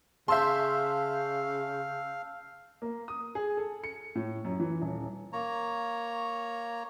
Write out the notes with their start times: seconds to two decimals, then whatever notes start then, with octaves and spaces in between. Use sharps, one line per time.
0.28 C#3 E5 F5 A5 C6 E6 G6
2.82 A#3
3.08 D#6
3.35 G#4
3.57 A4
3.84 C#7
4.15 A2
4.45 F#2
4.60 E3
4.82 D#1
5.33 A#3 C#5 A#5